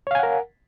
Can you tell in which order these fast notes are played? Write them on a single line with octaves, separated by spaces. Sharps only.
C#5 F5 G#5 F#5 A#4